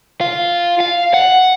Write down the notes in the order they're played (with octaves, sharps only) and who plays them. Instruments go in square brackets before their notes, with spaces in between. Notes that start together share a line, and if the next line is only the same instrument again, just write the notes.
[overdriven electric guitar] F4
F5
F#5